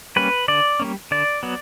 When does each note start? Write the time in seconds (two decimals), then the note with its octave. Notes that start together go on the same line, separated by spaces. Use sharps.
0.16 G3 A#3 C#4 B4
0.48 D3 D5
0.80 G3 A#3 C#4
1.11 D3 D5
1.43 F#3 B3